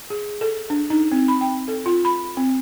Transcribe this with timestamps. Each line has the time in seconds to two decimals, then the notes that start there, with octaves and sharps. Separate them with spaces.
0.10 G#4
0.41 A4
0.70 D4
0.90 D#4
1.12 C4
1.28 B5
1.41 G5
1.68 A4
1.86 F4
2.05 B5
2.37 C4